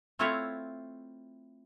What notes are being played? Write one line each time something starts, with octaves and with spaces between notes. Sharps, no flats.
A3 C4 E4 F4 C#5 E5